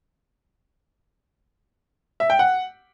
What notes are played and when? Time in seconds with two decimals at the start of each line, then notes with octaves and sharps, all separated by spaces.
2.20 E5
2.30 G5
2.39 F#5